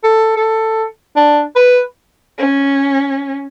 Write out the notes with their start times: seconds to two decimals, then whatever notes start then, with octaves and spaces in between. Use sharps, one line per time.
0.04 A4
0.37 A4
1.17 D4
1.56 B4
2.38 C#4